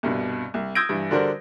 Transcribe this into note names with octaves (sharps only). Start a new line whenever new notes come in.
C2 G2 B2
C2
D#6 E6 G6 G#6 A#6 D7
G2 E3
D3 G3 D4 F#4 A#4 C5